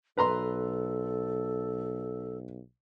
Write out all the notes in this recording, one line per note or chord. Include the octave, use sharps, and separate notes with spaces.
B1 A4 B4 A#5 C6